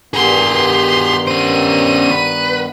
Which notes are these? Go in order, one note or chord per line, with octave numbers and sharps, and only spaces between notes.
G2 D#3 B3 G4 G#4 C6
C#4 C5 D#7
B4